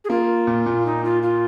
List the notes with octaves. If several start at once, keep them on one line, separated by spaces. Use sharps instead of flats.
G#4
A#3 F4
A#2
A#2
D#4
F4
F4